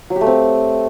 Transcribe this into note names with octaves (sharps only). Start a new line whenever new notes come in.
F#3
G4
A3
C4